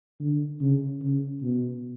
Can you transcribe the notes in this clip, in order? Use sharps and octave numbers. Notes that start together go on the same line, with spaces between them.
D3
C#3
C#3
B2